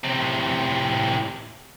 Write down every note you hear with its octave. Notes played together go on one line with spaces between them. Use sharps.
A2 C3